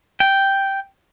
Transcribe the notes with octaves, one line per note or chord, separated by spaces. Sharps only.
G5